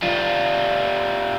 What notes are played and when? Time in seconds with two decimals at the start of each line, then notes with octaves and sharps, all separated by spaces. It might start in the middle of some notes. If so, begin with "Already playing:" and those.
0.02 G3 F4